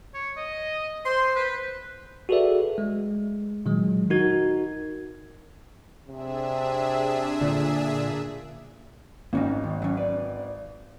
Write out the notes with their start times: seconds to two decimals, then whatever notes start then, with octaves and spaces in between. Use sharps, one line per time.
0.14 C#5
0.37 D#5
1.05 C5 C6
1.36 B4
2.29 F#4 G#4 A4 B4 D5 E5
2.78 G#3
3.66 A#2 D#3 F#3 G#3
4.10 D#4 F#4 A#4 G#6
6.09 C3 D4 G#4 E5
7.41 A#2 D3
9.33 G#1 A#3 C#4 D#4
9.64 D#3
9.82 F#3 C#4
9.97 B4 D5